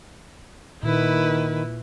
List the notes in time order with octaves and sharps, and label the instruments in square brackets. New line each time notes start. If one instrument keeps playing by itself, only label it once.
[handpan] A#2 [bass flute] D#3 [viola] E4 B4